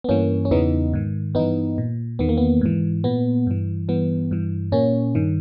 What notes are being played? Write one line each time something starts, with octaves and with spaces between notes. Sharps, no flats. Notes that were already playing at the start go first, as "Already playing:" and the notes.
B3
G2 E3 A#3 C#4
C#4
E2 C#3 E3 B3 D#4
G#2 D#3
G2 E3 B3 D#4
A#2
E2 D#3 B3
A#3
B3
G#2 E3
A#2 B3
G2 E3
G2 E3 B3
G2 E3
A#2 A#3 C#4
G2 D#3